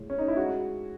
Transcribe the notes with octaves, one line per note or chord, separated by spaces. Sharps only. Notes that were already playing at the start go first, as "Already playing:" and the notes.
Already playing: A2 G#3
C#4
D#4
E4
G#3 F#4